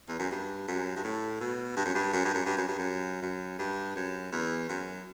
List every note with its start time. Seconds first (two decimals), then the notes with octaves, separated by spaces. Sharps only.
0.08 E2
0.19 F#2
0.31 G2
0.68 F#2
0.96 G2
1.04 A2
1.40 B2
1.76 G2
1.85 F#2
1.95 G2
2.13 F#2
2.25 G2
2.35 F#2
2.46 G2
2.57 F#2
2.68 G2
2.78 F#2
3.22 F#2
3.59 G2
3.96 F#2
4.32 E2
4.69 F#2